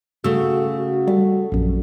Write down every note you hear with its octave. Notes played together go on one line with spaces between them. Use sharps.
C#3 A3 F#4 E6
F#4
G3 A3
A#1 F#2